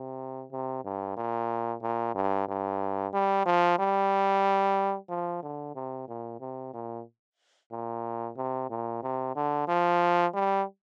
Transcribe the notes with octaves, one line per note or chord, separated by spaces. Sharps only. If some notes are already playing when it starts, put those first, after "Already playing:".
Already playing: C3
C3
G2
A#2
A#2
G2
G2
G3
F3
G3
F3
D3
C3
A#2
C3
A#2
A#2
C3
A#2
C3
D3
F3
G3